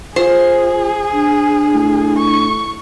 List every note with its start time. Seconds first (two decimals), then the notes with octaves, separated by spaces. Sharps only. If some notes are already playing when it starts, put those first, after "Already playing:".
0.16 F4 G#4 C5
1.12 D4
1.74 A2
2.18 C#6